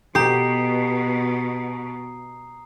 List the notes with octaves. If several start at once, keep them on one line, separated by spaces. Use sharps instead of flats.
B2 G4 A#5 D#6 C7